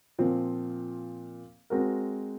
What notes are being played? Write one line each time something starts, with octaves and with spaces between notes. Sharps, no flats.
A#2 F3 C4
G#3 C4 F#4 A#4